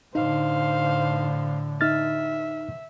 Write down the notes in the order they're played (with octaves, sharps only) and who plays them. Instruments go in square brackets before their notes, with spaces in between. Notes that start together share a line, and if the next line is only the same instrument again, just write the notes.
[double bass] A2 D3 [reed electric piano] D#4 [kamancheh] C5 F5
[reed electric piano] D#4 F6 A6 [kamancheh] E5